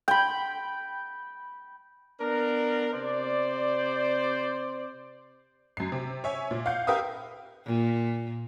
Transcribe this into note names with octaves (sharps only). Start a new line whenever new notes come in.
G5 B5
B3 D4 A#4
C3 C5 D5
F#2 C7
C3
C#5 E5 G#5
A#2
F5 F#5 G6
G4 A#4 B4 E5 F5 D#6
A#2